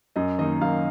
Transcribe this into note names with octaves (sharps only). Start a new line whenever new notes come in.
F#2 D#5
D#3 A#3 D#4 D#5
F#2 F5